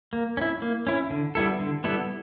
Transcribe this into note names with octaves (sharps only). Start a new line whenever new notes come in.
A#3
C#4
E4
A#3
C#4 E4
D3
G3 B3 E4 A4
D3
G3 B3 E4 A4